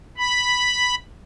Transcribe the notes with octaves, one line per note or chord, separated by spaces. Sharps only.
B5